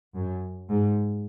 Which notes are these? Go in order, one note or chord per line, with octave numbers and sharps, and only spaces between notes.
F#2
G#2